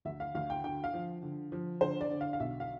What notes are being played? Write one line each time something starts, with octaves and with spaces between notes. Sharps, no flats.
D2 E5
F5
D2 F5
G5
D3 G5
F5
F3
D3
F3
D3 C5
D5
D3
F5
F5
B1 E5
F5